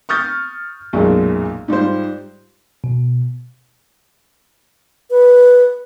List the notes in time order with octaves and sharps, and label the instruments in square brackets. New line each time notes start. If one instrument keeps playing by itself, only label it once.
[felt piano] C#6 D#6 F6 G6 A6
B1 F#2 A#2 G#3
G#2 G3 F4 C5
[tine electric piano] B2
[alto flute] B4